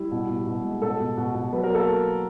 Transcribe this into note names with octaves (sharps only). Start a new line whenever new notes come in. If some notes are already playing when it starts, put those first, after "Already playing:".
Already playing: G3 E4
B2
B2
B2
G#3
B2 A4
B2
B2
B2
F#3 B4
A#4
A#3 A4